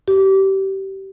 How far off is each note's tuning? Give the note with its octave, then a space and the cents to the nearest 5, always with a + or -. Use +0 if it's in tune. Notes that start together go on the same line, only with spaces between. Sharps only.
G4 -25